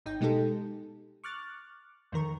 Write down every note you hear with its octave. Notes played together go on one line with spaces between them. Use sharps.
G#1 D#4 G5
B2 G#3 D#4 G4 A4
C#6 D6 F6 F#6 A6
F2 D#3 A#4 C#6